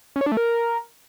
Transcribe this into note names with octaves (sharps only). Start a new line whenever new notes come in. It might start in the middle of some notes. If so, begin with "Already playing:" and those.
C#4
C#5
D4
A3
A#4